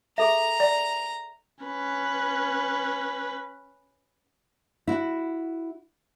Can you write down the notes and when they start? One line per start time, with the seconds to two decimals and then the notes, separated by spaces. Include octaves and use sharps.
0.18 G#4 A4 E5 A#5
0.60 D5
1.65 C#4 B4
4.87 E4 F#4